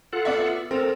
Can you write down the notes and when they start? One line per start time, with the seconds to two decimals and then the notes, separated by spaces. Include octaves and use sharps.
0.13 F4 A4 F#5
0.25 B3 D5 E5
0.71 C4 A4 A#4